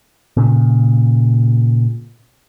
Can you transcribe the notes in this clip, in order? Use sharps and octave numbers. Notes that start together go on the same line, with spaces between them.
A#2 C#3